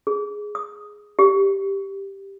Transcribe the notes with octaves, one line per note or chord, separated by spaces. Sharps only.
G#4
D#6
G4